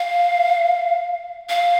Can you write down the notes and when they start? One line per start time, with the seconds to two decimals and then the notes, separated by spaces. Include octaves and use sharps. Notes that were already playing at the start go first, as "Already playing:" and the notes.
Already playing: F5
1.49 F5